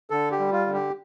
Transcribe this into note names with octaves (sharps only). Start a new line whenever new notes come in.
D3 A4
G4
G3
F4
D3
G4